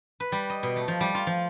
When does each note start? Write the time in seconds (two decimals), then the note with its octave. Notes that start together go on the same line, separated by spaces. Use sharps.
0.20 B4
0.32 G3
0.50 D#5
0.63 B2
0.76 A3
0.88 F3
1.01 G3
1.15 F4
1.27 F3